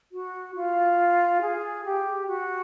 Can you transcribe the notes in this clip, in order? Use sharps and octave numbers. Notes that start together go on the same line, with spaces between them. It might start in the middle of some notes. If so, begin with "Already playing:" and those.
F#4
F4
G#4
G4
F#4